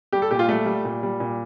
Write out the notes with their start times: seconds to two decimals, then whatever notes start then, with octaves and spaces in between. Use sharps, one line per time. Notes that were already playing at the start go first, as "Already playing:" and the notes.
0.13 G3 G4
0.22 A4
0.31 A#2 G4
0.39 F4
0.49 G3 A3
0.66 G3
0.85 A#2
1.03 G3
1.20 A#2